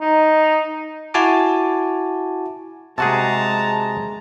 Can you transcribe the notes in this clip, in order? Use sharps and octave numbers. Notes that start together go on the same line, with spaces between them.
D#4
E4 F#4 G#5 A5 D6
C3 G#3 F#4 G#4 A5 A#5